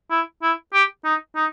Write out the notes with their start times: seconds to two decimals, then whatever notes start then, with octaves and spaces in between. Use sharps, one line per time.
0.11 E4
0.43 E4
0.74 G4
1.05 D#4
1.36 D#4